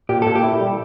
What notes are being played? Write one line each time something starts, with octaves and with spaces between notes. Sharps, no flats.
A#2 G4
A4
A#2
G4
E4
G3